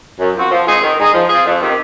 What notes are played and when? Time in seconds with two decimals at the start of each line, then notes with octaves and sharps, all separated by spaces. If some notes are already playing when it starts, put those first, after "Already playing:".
0.19 F#2
0.35 F3 C4 F#4
0.51 F3
0.66 G#3 C4 D#4 G#4
0.82 D#3
0.97 G#3 D#4 G#4
1.14 F3
1.29 C4 F4 G#4
1.45 F2
1.61 C3 D#3